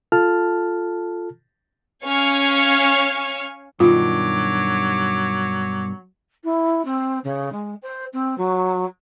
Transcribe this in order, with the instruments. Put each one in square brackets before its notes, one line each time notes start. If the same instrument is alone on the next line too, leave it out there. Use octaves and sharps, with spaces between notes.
[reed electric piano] F4 A4 A5 F6
[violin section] C#4 C#5 F5 G#5 C#6 F6
[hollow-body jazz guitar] G2 B2 D#3 [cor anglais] F#3 [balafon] F4 [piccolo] D6
[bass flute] E4
C4
C#3
G#3
C5
C4
F#3